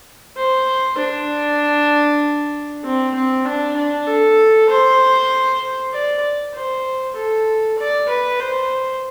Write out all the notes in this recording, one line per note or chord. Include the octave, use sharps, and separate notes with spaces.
C5
D4
C4
C4
D4
D4
A4
C5
D5
C5
A4
D5
B4
C5